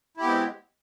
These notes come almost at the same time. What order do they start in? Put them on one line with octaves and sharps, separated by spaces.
E4 G4 B3 C4 G#3